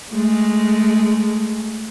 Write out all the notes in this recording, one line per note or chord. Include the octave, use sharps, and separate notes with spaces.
G#3 A3